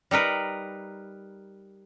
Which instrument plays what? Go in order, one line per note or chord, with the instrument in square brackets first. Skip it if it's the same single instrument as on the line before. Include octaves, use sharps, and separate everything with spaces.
[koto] G3 D#4 A#4 B4